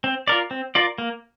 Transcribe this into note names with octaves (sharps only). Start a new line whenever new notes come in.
C4
F4 A#4 D5
C4
F4 A#4 D5
A#3